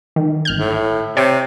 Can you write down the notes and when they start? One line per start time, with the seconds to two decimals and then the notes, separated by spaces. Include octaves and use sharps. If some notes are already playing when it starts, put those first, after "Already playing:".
0.16 D#3
0.45 G#1 F6 G6
0.59 A2
1.17 C3 C#5 G5